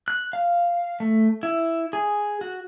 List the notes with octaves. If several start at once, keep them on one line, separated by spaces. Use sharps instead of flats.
F#6
F5
A3
E4
G#4
F#4